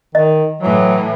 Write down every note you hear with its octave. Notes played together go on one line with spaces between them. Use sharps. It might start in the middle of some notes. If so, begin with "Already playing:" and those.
D#3 D#5
A2 E3 F#3